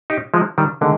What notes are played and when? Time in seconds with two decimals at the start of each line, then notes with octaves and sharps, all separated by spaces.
0.10 D#4 G4
0.34 F3 G#3
0.58 D#3 G3
0.81 D3 D#3 G#3